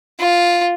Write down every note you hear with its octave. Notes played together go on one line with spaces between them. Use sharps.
F4